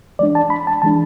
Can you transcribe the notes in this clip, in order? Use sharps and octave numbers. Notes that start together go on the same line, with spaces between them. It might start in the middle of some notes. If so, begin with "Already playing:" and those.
E3 G#3 D4 D5
A5
B5
A5
E3 G#3 D4 A5